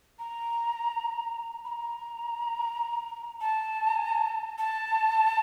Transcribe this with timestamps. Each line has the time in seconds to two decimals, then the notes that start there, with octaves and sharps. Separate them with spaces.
0.19 A#5
1.65 B5
1.68 A#5
3.41 A5
4.58 A5